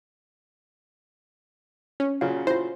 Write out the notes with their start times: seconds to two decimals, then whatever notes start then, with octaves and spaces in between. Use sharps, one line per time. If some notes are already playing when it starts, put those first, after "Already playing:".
2.00 C#4
2.21 A#2 C#3 F#3 F5
2.47 E4 F4 C5